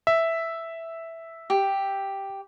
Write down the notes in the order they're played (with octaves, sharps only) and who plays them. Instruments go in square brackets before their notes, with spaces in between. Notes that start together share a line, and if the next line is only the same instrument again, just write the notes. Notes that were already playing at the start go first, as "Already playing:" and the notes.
[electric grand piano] E5
[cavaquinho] G4